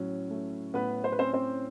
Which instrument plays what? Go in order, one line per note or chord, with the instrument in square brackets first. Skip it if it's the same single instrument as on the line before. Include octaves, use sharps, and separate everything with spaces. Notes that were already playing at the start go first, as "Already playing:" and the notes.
Already playing: [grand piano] A2 F#3 C#4
A3
[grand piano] A2 [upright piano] B3 B4
[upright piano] C5
B4
[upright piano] C4 C5 [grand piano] C#4
[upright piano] C4 C5